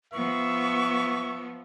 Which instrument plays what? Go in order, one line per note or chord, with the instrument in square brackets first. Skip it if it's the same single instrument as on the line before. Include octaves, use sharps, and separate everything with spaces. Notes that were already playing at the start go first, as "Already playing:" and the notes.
[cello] F3 B3 [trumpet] E5 [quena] C#6